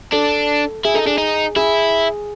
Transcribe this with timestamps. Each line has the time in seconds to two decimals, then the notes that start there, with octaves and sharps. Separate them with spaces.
0.12 D4 A4
0.85 E4 G#4
0.94 D#4 A4
1.06 D4 G#4
1.18 D#4
1.56 E4 G#4